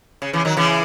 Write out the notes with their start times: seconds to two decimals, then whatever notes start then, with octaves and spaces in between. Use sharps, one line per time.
0.22 C#3
0.33 C#3 E3
0.45 D#3 F#3
0.57 C#3 E3